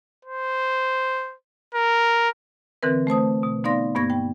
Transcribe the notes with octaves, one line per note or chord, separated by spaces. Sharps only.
C5
A#4
D3 E3 C4 A#4 B4
A3 C5 A5 D#6
B2
B3 D#4 D5 F5 C6 A#6
G2 A#3 B3 C#6 G#6 A#6
G5